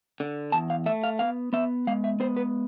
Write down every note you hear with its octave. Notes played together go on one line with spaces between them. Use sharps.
D3
E2 A5
F5
A3 E5
F5
B3 F5
B3 E5
G#3 F5
E5
B3 C5
B4